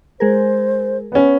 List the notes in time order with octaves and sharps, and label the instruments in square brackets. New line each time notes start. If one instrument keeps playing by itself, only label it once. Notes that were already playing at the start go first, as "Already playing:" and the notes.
[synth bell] G#3 G#4 A#4 [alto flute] C5
[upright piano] B3 C#4